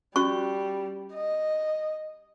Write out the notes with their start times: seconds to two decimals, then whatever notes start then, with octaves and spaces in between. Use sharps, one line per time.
0.16 G3 C#4 F#4 C#6
1.13 D#5